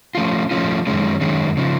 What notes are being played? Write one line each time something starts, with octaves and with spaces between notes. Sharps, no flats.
F3 A3 C#4 F4
F3 A3 C#4 F4
F#2 D#3 G#3 C#4
F#2 D#3 G#3 C#4
C#3 F3